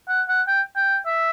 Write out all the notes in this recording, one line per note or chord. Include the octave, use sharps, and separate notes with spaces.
F#5
F#5
G5
G5
E5